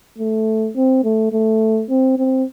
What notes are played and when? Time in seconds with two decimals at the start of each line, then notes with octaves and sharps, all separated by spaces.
0.18 A3
0.76 C4
1.04 A3
1.33 A3
1.89 C4
2.18 C4